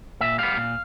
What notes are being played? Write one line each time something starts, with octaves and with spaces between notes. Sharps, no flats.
A#2 E5
G3 B3 F5
A#2